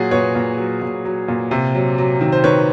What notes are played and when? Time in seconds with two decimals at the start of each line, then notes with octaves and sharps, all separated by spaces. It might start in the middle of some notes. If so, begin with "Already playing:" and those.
Already playing: A#2 F#3 F#4 G#4
0.11 A#2 B4 C#5
0.35 A#2
0.58 F#3
0.81 A#2
1.05 F#3
1.28 A#2
1.51 C3
1.75 F#3
1.98 F#3
2.21 D#3
2.32 C5
2.44 D#3 B4 C#5